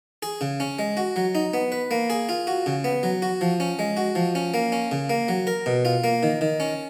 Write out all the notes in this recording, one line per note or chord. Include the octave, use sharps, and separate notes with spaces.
G#4
C#3
C#4
G#3
F#4
F#3
D#4
B3
B4
A#3
G#4
F4
F#4
C#3
B3
F#3
F#4
F3
C#4
G#3
F#4
F3
C#4
A#3
C#4
C#3
A#3
F#3
A#4
B2
F4
A#3
D#3
D#3
C#4